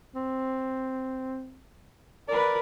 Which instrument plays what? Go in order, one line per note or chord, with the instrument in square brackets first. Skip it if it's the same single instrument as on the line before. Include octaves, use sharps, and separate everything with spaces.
[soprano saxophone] C4
[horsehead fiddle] A#4 B4 [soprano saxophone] D5